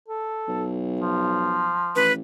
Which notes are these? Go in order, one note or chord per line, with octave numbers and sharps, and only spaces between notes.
A4
B1
F3
A1 B4